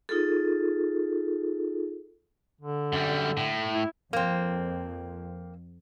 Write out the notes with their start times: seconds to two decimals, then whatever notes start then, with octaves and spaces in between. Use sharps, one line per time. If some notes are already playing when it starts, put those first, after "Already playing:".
0.09 D#4 F4 G#4 A4
2.61 D3
2.93 F#2 G3
3.37 A2
3.72 E4
4.13 F2 A#3 C4